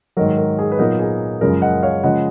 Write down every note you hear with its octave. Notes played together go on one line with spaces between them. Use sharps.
G#2 D#3 F#3 A#4
A#4
G#4
B4
A#2 F#3 B3 D#4 A#4
G#4
F#2 C#3 F3 G#3 A#4
D#5 F#5
C#5 F5
C#3 F3 G#3 D#5 F#5